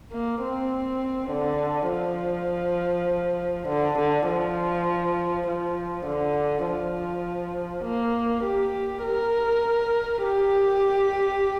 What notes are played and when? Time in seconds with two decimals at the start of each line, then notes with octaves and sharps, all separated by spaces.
0.12 A#3
0.41 C4
1.31 D3
1.90 F3
3.68 D3
3.98 D3
4.28 F3
5.47 F3
6.06 D3
6.66 F3
7.85 A#3
8.44 G4
9.03 A#4
10.23 G4